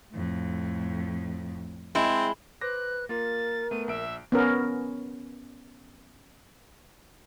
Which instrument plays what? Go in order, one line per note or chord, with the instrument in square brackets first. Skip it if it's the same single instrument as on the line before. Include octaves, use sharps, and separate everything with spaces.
[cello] F2 A2
[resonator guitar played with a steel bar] G#3 E4 [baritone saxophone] C4
[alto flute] B4 [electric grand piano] C5 D6 A#6 [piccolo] F#6
[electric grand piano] A#3 F4 [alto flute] A#4 [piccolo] A6
[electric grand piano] A3 B3 [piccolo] D#7
[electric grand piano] A#1 D7 [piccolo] E5
[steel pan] B3 C#4 A#4